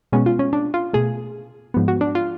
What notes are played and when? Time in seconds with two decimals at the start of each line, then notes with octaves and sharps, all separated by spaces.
0.12 B2 G#3 B3 C#4
0.26 F4
0.39 C#4
0.53 D4
0.74 F4
0.93 B2 A3 G#4
1.74 G#2 F3 B3
1.88 F#4
2.01 D4
2.15 F4